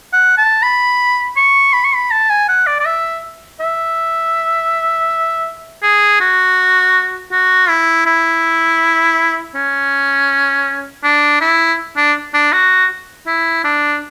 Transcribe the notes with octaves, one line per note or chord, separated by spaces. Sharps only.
F#5
A5
B5
C#6
B5
C#6
B5
A5
G#5
F#5
D5
D5
E5
E5
G#4
F#4
F#4
E4
E4
C#4
D4
E4
D4
D4
F#4
E4
D4